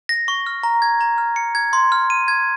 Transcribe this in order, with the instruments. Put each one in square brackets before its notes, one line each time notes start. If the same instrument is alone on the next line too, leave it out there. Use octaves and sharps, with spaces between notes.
[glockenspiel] A#6
C#6
F6
A#5
G#6
A#5
F6
C#7
G#6
C6
F6
D#7
G#6